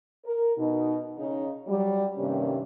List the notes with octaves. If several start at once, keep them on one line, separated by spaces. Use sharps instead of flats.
A#4
B2 D#4
C#3 D#4
F#3 G3
G2 C3 D#3 G3 A#3 C#4